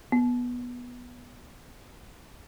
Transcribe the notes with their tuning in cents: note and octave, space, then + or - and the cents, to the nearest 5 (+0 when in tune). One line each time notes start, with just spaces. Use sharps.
B3 -10